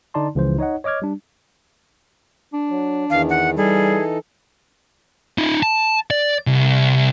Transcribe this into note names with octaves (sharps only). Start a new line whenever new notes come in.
D3 D#4 D5 A5 C6
C#2 C#3 E3 F3 C5
D#4 C#5 D#5 F#5
C#5 D#5 D6 F6 G#6
G3 D4
D4
F#3
E2 D#3 E3 F5
F#5
E3 G3 D#4 G#4 A4
D#4 F4
A5
D5
C2